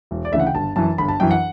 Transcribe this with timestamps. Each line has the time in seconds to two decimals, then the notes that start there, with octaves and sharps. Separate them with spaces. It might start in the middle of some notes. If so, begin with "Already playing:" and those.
0.11 E1
0.25 D5
0.32 D2 C#3 E3 E5
0.40 F#5
0.47 G5
0.55 G1 A5
0.76 F#2 E3 A5
0.98 G1 B5
1.08 A5
1.20 F#2 E3 G5
1.31 F#5